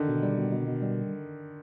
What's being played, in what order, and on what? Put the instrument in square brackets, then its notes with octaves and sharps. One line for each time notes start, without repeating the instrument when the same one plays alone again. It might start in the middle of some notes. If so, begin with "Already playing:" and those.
Already playing: [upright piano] D3 D#3
[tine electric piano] B2
G3
B2
B2
B2
G3